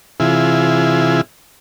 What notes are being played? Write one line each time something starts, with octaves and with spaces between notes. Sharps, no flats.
C3 E3 E4 F4 G#4